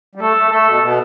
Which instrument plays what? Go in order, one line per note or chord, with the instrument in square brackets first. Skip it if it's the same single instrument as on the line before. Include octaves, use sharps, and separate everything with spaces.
[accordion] G3
[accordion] A3 [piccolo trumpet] A4
[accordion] A3
[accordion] A3 [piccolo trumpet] A4
[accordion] B2
B2